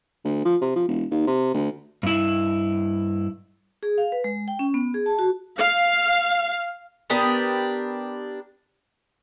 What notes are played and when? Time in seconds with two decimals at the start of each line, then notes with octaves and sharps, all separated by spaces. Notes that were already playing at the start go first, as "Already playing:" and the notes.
0.24 D2
0.45 F3
0.61 C3
0.76 F3
0.88 E1
1.11 D#2
1.27 C3
1.54 D2
2.03 G2 E4
3.83 G#4
3.98 F5
4.12 B4
4.24 G#3
4.48 G5
4.59 C#4
4.74 B3
4.94 G#4
5.06 A5
5.19 F#4
5.58 F5
7.10 B3 D4 G4 A#4